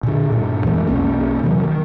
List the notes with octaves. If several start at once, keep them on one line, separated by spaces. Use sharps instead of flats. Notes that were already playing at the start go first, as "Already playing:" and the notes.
A#2 D3
G2 A#2
F2 E3 G#3
B1 F2 A#3 C#4
C3 E3 F#3
D#3